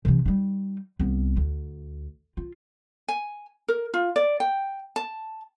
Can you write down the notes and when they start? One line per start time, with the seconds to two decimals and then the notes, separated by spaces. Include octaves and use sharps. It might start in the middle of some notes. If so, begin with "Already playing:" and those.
0.05 C3 E3
0.26 G3 D#4
0.99 C2 B3
1.37 D2
2.37 F4
3.08 G#5
3.68 A#4
3.94 F4
4.16 D5
4.40 G5
4.96 A5